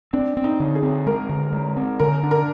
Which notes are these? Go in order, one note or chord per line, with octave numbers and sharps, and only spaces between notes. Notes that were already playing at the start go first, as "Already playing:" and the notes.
C4 D4
C4
D#4
D3
G#4
C4
G#3 A#4
D3
G#3
C4
D3 A#4
D4
A#4